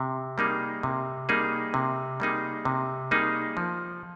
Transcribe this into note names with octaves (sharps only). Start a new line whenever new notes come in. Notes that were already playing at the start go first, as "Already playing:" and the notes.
Already playing: C3
G3 A#3 D#4 G#4
C3
G3 A#3 D#4 G#4
C3
G3 A#3 D#4 G#4
C3
G3 A#3 D#4 G#4
F3